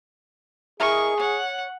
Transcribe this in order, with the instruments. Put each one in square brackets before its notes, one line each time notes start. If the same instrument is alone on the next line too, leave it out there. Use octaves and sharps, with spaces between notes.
[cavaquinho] E4 A#4 D#5 [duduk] G#4 [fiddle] C#6
[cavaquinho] C#5 [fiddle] F#5